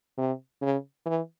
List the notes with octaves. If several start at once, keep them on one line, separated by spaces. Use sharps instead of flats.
C3
C#3
E3